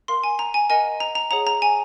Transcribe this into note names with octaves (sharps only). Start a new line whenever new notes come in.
A#4 F5 C6
G#5
A#5
G#5
A#4 D#5 F#5 G#5
A#5
A#5
G#4 C#5 F#5 A#5
A#5
G#5